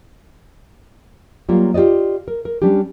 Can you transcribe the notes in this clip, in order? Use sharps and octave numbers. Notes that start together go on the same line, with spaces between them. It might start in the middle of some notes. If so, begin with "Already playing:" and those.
F#3 G3 A#3 F4
F4 G4 B4 D5 D#5
A#4
A#4
G3 C#4 D4 G4